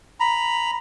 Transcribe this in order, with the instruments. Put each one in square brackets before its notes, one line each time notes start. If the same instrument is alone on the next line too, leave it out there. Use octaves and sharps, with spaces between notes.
[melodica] A#5 B5